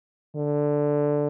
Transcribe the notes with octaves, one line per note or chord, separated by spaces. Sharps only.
D3